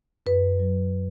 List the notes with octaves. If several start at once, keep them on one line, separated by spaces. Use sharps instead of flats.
F#2 B4
F#3